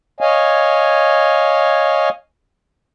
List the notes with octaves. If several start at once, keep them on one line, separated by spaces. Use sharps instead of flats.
C#5 D#5 F5 G#5